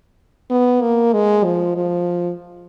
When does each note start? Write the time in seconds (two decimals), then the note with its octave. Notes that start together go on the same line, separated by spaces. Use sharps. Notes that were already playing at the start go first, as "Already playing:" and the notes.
0.51 B3
0.82 A#3
1.13 G#3
1.45 F3
1.76 F3